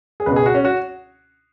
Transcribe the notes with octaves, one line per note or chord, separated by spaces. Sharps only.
G#4
C#2 B2 B4
G#4
F#4
C#4
F#4